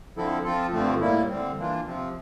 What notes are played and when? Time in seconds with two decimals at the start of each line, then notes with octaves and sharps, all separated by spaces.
0.16 D3 F3 C4 E4 A4
0.44 F3 C4 F4 A4
0.72 G2 D3 F3 A3 C4
1.01 A2 G3 A#3 E4
1.29 D3 G3 C4
1.57 E3 A#3 D4 F4
1.86 C3 F3 C4